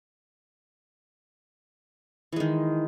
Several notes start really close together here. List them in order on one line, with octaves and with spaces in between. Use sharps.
E3 G#3 D#3